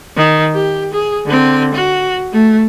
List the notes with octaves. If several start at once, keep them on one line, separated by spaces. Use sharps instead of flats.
D#3
G4
G#4
D3 C4
F#4
A3